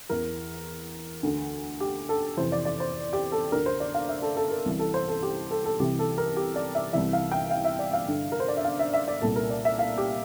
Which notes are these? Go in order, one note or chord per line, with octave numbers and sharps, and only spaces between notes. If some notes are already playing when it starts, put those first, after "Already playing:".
E2 E3 A#4
D2 D3
G4
A4
F2 C3 E3 C5
D5
D5
C5
G4
A4
D2 D3 A#4
C5
D5
F5
E5
A4
A4
A#4
C2 C3 E3
A4
C5
A4
G4
A4
A4
C2 C3 E3 G4
A4
A#4
G4
D5
E5
C2 C3 E3 E5
F5
G5
F5
E5
D5
F5
G2 D3
A#4
C5
D5
E5
F5
E5
E5
D5
C2 A#2 A4
A#4
D5
E5
F5
G4